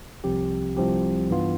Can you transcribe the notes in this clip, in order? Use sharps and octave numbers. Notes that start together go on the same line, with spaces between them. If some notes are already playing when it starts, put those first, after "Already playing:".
C2 C3 F3 C4 G4
C2 C3 F3 C4 G4
G2 E3 B3 F4